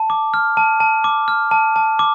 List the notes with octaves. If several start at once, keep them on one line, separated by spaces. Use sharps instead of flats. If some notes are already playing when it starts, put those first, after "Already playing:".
Already playing: A5
D6
F6
A5
A5
D6
F6
A5
A5
D6